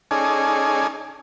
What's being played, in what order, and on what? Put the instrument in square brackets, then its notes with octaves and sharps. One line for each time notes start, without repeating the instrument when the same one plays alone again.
[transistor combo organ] C#4 D#4 G#4 A4 D5 G#5